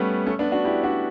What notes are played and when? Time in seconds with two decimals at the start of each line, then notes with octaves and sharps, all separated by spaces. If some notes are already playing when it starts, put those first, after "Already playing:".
Already playing: G3 A3 B3 C#4
0.26 A3 C#4
0.39 B3 D4
0.52 D4 F#4
0.65 E4 G4
0.84 D4 F#4